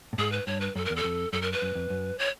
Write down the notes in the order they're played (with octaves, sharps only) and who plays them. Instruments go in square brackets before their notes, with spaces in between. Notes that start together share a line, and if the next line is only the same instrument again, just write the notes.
[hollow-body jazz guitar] A2
[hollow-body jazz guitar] G#2 [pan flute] G#4
[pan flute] B4
[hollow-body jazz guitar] G2 [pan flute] C#5
[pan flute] B4
[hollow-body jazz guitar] F#2 [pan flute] A4
[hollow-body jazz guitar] E2 [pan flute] A#4
[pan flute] A4
[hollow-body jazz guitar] F2
[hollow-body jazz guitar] F#2 [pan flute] A4
[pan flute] A#4
B4
[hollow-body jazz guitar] F#2
F2
F#2
[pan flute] C#5